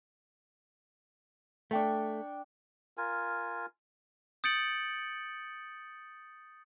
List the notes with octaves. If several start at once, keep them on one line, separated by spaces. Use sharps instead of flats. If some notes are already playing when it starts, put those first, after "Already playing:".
A3 D4 G5 C#6
F4 A#4 G#5
D#6 G6 A6 C#7 D7 F#7